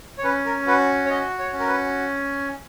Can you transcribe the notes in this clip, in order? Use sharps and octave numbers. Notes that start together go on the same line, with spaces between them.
C#5
C#4 B4
A#4
F#4 B4
C#5
F#4 D#5
C#5
C#4
A#4
B4